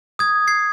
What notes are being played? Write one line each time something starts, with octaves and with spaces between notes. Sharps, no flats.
D#6 G#6
G#6 C7